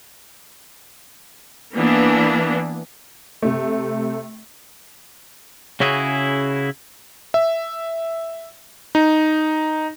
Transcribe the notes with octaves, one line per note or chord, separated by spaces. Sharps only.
E3 A#3 B3 D4
C3 A3
C#3 C#4 E4 F#4 G#4
E5
D#4